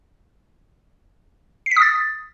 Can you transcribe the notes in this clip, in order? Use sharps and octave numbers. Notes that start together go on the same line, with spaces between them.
C7
B6
D#6
A6